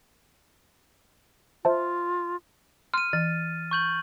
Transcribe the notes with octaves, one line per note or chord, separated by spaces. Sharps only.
F4 C5 E5 A5
C6 F6 D#7
E3 A6
C#6 G6 F#7